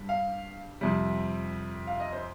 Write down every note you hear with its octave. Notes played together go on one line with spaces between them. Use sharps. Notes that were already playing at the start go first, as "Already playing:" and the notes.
Already playing: G2 G3
F5
F2 C3 G3
F5
D#5
C5